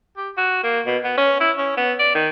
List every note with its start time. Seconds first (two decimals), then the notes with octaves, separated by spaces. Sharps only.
0.17 G4
0.37 F#4
0.63 A#3
0.86 B2
1.04 B3
1.17 C#4
1.40 E4
1.58 C#4
1.77 B3
1.99 D5
2.15 D#3